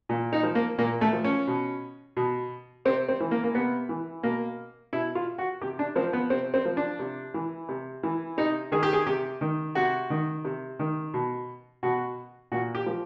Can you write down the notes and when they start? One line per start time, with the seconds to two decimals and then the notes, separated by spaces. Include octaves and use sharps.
0.09 A#2
0.33 D#4
0.43 F3
0.55 A#3
0.78 A#2 A#3
1.01 A3
1.13 F3
1.24 C#4
1.47 B2
2.17 B2
2.85 C3 C4
3.09 C4
3.20 E3
3.31 A#3
3.44 A#3
3.55 C3 B3
3.89 E3
4.23 B2 A#3
4.93 B2 E4
5.15 F4
5.38 F#4
5.61 C3 G4
5.79 D4
5.96 F3 C4
6.13 B3
6.30 C3 C4
6.54 C4
6.65 F3
6.77 D4
6.99 C3
7.34 E3
7.69 C3
8.03 E3
8.38 C3 D#4
8.72 D#3 G#4
8.83 G4
8.93 G#4
9.07 C3 G4
9.41 D#3
9.75 C3 F#4
10.10 D#3
10.45 C3
10.79 D#3
11.14 B2
11.83 B2 F#4
12.52 A#2 F#4
12.75 G4
12.86 F3